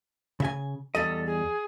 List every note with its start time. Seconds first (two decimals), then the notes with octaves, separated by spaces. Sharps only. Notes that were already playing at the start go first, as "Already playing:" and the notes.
0.40 C#3 E5 G#5
0.95 E2 G3 A4 D#5
1.26 G#4